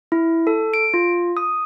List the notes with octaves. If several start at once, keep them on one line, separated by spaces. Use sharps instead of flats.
E4
A4
D7
F4
D#6